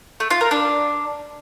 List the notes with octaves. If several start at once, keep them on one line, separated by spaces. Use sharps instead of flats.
A3
F4
A#4
D4